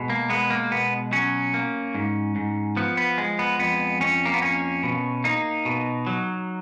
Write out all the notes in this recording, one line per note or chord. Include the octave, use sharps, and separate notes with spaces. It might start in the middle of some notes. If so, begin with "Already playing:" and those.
Already playing: B2 G#3
A#3
G#3 B3
A#3
B2 B3
F#3 C#4
A#3
G#2
G#2
F3 B3
B3
G#3
B3
F2 B3
F2 C#4
A#3
B3
A#3 C#4
B2
A#3 D#4
B2
F#3